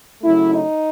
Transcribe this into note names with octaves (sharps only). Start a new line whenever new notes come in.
C#3 F#3 A3 E4
D#4